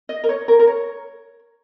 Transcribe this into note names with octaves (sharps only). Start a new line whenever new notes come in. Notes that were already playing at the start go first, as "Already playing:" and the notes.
D#5
A#4
C#5
A#4
A#4
C#5